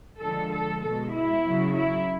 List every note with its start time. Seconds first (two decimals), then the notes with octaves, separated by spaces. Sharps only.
0.21 D3 F3 G#3 A4
0.52 A4
0.83 B2 G#3 A4
1.13 E4
1.44 C#3 F#3
1.74 E4